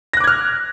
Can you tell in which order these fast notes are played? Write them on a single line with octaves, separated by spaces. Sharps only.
A#6 F#6 D6 G#6 F6